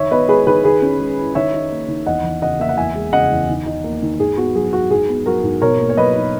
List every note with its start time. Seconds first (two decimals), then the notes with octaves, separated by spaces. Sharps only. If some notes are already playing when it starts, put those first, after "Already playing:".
Already playing: D#3 C#5 E5
0.11 B3 B4 D#5
0.29 G#3 G#4 B4
0.47 D#3 G#4 B4
0.64 D#3 G#4 B4
0.82 C#4
1.00 G#3
1.18 E4
1.35 D#3 C#5 E5
1.54 D#4
1.72 A#3
1.88 D#3
2.06 E2 D#5 F#5
2.24 E3
2.42 C#3 D#5 F#5
2.59 A#3 E5
2.69 F#5
2.77 E2 E5 G#5
2.95 G#3
3.13 C#3 D#5 F#5
3.31 E2
3.49 D#3
3.66 D#4
3.84 A#3
4.03 D#3
4.20 G#2 G#4
4.37 B3 F#4
4.55 F#3 G#4
4.73 G#2 F#4
4.91 G#2 G#4
5.09 B3
5.26 F#3 F#4 A#4
5.44 G#2
5.62 B2 A#4 C#5
5.79 A#3
5.89 C#5
5.97 F#3 B4 D#5
6.16 D#4